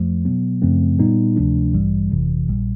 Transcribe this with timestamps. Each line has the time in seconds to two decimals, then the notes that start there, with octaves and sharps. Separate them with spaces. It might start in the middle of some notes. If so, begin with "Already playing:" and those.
Already playing: F2 F3 A3
0.25 B2 F#3 B3
0.62 F#2 C#3 F3 A3 C4
0.99 A#2 G3 B3 D#4
1.37 D2 C3 F3 A3 D4
1.73 A1 G2 E3 G3
2.10 G1 F2 C3 E3
2.48 A#1 A#2 G3